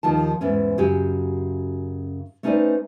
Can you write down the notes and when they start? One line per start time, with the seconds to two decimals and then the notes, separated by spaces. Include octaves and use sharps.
0.03 D#2 D#3 F3 A5
0.41 E2 G#2 E3 C#4
0.78 F#2 C#3 F#4 G4 G5 G#5
2.43 A3 C#4 D#4 B4 C5 D5